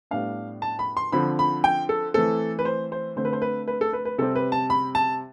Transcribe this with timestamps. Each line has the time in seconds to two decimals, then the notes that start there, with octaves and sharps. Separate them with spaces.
0.11 A2 G3 B3 D4 F5
0.62 A5
0.79 B5
0.97 C6
1.12 D3 F3 C4 B5
1.39 B5
1.64 G5
1.89 A4
2.14 E3 A3 C4 A4
2.59 B4
2.65 C5
2.92 C5
3.16 D3 A3 C4 C5
3.25 B4
3.33 C5
3.42 B4
3.68 B4
3.81 A4
3.93 B4
4.05 B4
4.18 C3 G3 C4 A4
4.35 B4
4.52 A5
4.70 B5
4.95 A5